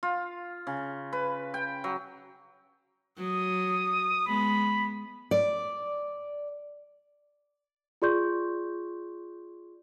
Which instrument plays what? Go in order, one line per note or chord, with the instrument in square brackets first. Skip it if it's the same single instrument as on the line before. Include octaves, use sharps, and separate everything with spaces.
[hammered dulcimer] F4
C#3
B4
G5
F#3
[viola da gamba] F#3 [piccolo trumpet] D#6
[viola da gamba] G#3 B3 [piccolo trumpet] B5
[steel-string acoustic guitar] D5
[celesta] F4 G#4 D5 C6 C#6 G6